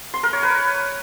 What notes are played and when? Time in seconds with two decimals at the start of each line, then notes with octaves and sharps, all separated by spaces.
0.14 C6
0.23 A#4
0.33 C#5
0.43 B4